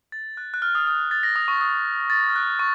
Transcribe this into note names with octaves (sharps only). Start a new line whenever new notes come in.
A6
F#6
F#6
F6
D#6
D#6
A6
A#6
D#6
C#6
D#6
A6
F6
F#6
C#6